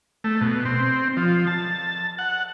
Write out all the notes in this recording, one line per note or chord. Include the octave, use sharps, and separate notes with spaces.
A3
B2
C4
F3
A5
F#5